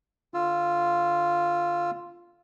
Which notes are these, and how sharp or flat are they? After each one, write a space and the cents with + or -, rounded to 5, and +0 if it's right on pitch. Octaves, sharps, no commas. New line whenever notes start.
D3 +0 F4 +0 E6 +25